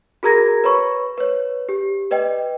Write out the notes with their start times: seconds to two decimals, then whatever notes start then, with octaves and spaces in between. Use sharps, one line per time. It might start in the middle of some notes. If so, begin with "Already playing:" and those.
0.23 F#4 G#4 A#4 A#5 G#6 A#6
0.64 B4 C#5 B5 C#6
1.18 B4 C#5
1.69 G4
2.11 B4 D5 D#5 G5